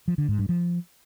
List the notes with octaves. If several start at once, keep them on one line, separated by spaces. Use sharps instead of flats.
F3
D3
G#2
G2
F3